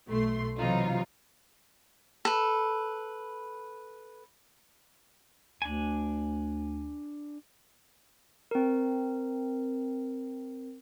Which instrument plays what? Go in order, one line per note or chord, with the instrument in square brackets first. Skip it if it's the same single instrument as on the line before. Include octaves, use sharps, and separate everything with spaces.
[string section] B1 A3 C6
C3 E3 F#3 D#4 F4
[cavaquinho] A4 B4
[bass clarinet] D2 [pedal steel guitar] D4 G#5
[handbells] C4 A#4